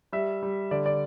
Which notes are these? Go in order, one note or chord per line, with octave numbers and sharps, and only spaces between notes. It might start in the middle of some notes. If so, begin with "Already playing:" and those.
G3 E5
G3
D3 D5
D5